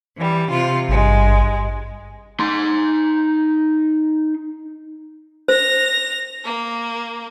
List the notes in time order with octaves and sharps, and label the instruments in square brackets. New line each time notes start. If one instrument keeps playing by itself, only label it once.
[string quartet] E3 G3
C3 F4
[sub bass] G#1 [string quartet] G2 G#3
[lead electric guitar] D#4 C6
[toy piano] C5 [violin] A#6 F7
[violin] A#3